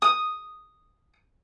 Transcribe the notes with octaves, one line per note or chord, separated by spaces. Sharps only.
D#6